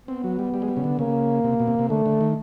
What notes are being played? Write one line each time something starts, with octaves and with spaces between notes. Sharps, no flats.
B3 C4
F#3
G3
G3
G#3
G3
C#3
D3
C#3 A#3
C3
B2
C3
C3
D3 A3
D3
D#3